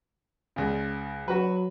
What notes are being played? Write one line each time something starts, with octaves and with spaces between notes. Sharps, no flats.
C#2 C#3
F#3 F#4 B4